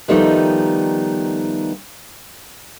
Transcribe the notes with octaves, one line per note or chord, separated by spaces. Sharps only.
D#3 F3 G3 A3 B3 D#4